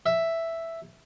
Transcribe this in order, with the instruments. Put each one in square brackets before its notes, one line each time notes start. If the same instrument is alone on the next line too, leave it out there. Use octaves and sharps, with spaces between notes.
[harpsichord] E5